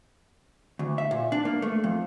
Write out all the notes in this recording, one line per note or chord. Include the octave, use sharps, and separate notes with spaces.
D2
E5
A#2
D4
A#3
A3
F2